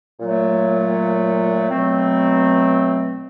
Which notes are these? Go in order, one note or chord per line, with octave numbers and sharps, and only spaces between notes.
A#2 F#3 A3
B2 F#3 A3 C4